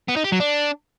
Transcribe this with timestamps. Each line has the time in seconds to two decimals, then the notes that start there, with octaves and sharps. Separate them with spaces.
0.08 B3
0.16 D#4
0.24 G4
0.32 F#3
0.40 D4